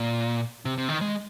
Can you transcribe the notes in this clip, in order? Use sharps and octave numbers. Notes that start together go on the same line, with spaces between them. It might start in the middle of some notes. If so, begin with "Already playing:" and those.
Already playing: A#2
C3
C3
D#3
G#3